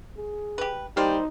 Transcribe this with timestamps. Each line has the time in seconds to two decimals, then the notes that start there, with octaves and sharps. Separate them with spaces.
0.17 G#4
0.58 G4 B4
0.97 G3 A#3 D#4 C5